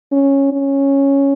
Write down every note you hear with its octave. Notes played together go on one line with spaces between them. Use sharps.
C#4
C#4